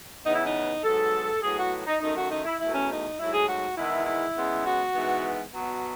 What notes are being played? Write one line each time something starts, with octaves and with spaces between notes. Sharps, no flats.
E2 C#3 E3 B3 D#4
E4
D#4
G#2 F#3 B3 A4
A2 F#3 B3 G#4
F#4
D#4
F#2 D#3 A3 D#4
F#4
D#4
E4
E2 B2 F#3 A3 E4
C#4
D#4
G#2 F#3 A3 E4
G#4
F#4
E2 D#3 G#3 B3 E4
E4
C#3 G#3 B3
F#4
G#2 E3 B3
B2 F#3 B3